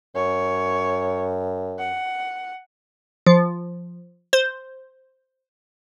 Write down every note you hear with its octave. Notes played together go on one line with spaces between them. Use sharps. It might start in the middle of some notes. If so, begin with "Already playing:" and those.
F#2 C#5
F#5
F3
C5